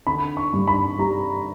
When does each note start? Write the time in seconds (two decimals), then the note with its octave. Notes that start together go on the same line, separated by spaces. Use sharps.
0.07 D3 B5
0.37 C#6
0.53 G2
0.68 B5
0.99 G3 A#5